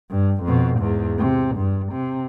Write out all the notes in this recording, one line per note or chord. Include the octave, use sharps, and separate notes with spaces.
G2
F2 B2
E2 G#2
C3
G2
C3